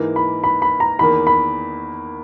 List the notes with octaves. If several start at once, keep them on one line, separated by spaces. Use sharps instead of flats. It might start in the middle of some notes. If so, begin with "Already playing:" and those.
Already playing: G#2 E3 A#3
B5
B5
B5
A#5
E2 D#3 A#3 B5
B5